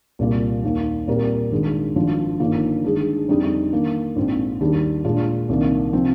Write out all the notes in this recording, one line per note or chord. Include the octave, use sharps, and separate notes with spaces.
C2 A#2 G3 A#3 F4
D#2 D#3 A#3
A#2 G3 C4 G4 A#4
G#1 G2 D#3 G#3
G#1 G2 F3
G1 G2 D#3 A#3 F4
G2 D#3 G#3 D4 G#4
F2 D3 G3 C4 D#4
D#3 A#3 D4
A#1 G#2 F3 C4
D#2 D#3 G3 D4 G4
A#2 G#3 D4 F4
C2 C3 D#3 A#3 D4
C3 F3 C4